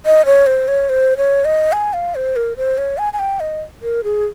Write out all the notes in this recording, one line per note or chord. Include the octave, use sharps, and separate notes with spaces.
D#5
C#5
C5
C#5
C5
C#5
D#5
G#5
F5
C5
A#4
C5
C#5
G#5
G#5
G5
D#5
A#4
G#4